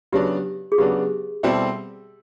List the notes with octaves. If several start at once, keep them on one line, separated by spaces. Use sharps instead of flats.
C#3 F#3 B3 D4 G4
G#4
C#3 F#3 B3 D4 G4
B2 G3 C4 E4 A4